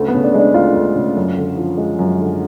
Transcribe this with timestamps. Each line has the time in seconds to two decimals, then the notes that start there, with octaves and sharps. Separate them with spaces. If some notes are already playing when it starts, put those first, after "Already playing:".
Already playing: D2 C#3 A3
0.08 B3
0.14 C#3
0.24 D4
0.34 G#3 D4
0.54 D2 F4
0.75 D2
0.96 C#3
1.16 F#2
1.37 D3
1.57 F3
1.78 G#3
1.99 F#2
2.19 D3